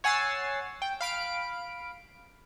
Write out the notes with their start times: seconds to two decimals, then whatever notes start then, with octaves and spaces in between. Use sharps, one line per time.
0.04 C#5 F#5 G#5 E6 A6 C7
0.82 G5
1.01 F5 B5 D7